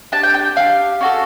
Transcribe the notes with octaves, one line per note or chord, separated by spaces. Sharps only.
D4 G4 A5
G5
G5
D4 G4 F5
C#4 F#4 A4